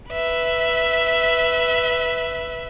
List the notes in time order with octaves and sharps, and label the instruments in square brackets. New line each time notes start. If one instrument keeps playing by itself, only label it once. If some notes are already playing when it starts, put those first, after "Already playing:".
[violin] B4 E5